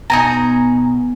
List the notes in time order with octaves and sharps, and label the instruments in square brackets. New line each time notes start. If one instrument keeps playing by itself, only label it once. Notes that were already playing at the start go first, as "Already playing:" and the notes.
[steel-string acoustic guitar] B2 [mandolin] D#4 G#5 A#5